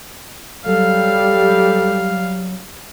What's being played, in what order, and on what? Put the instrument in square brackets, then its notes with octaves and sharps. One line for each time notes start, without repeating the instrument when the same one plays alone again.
[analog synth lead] F#3 [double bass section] G3 [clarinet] A4 [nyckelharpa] F5